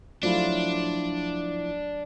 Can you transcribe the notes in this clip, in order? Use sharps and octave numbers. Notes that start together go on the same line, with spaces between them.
F3 F#3 A3 D4 E4 F4